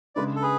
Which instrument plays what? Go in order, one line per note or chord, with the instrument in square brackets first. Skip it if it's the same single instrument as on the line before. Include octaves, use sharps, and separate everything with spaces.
[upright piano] C#3 G#3 D4 [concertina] B4 D5
[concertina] A4
G#4 B4